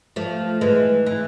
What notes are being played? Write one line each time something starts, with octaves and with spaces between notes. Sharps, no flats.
F3 A3
E3 G#3
E3